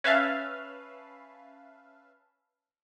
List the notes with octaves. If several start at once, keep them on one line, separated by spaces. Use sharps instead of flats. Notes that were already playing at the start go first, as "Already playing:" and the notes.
C#4 B4 E5 F5 A5